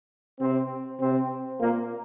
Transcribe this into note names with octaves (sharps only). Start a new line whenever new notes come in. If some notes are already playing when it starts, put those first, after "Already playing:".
C3 C4
C3 C4
A#2 A#3